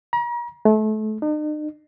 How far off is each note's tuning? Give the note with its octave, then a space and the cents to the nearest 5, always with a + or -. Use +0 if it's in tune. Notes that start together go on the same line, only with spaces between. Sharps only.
A#5 +40
A3 -30
D#4 -45